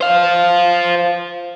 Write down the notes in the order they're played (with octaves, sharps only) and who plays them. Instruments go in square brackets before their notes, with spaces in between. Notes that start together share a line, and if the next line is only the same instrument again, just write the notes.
[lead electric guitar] C5 F5